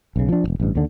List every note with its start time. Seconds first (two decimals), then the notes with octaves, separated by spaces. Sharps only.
0.16 B1 C#3
0.29 F3 D4
0.44 E1 A#1
0.60 A1 G2
0.75 D#2 D3